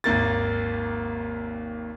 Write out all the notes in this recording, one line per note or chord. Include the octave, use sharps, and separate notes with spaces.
G#1 D#2 A#3 A6